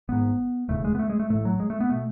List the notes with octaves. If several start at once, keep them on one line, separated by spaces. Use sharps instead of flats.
G#1 G#2 B3
E1 D#2 C#3 A3
G#3
B3
A3
G#3
A3
A1 A2 A3
F#3
G#3
A3
B3
B2 A3